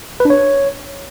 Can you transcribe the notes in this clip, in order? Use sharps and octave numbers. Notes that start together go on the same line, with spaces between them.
B4
D4
C#5